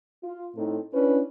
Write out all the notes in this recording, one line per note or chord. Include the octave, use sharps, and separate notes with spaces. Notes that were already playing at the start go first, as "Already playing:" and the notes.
F4
A2 C4 D#4 A4
C#4 D4 E4 B4